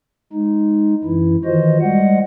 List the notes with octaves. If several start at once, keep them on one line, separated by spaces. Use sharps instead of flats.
G#3 D#4
F#2 E3 E4
D#3 E3 F4 F#4 C5 D#5
G3 G#3 D#5 F#5